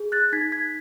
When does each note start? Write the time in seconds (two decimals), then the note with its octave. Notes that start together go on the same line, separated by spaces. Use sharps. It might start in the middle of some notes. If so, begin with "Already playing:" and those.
Already playing: G#4
0.12 F#6 A6
0.33 D#4 G#6 B6
0.52 G#6 B6